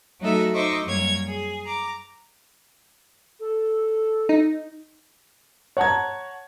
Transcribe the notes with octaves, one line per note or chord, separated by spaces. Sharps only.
F#3 A3 D#4 F#4 A4 E5
D#4 C5 D#5 E5 C#6 D6
F#2 G3 A#3 C#5 G#6
G#4
A#5 D6
A4
D#4
C#5 F#5 A5 A#5 G#6